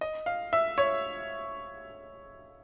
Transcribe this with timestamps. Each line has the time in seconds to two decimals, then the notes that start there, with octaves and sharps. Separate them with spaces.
0.01 D#5
0.26 F5
0.53 E5
0.78 C#5